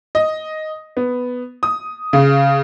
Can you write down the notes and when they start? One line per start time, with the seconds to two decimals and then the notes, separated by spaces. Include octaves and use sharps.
0.15 D#5
0.97 B3
1.63 D#6
2.13 C#3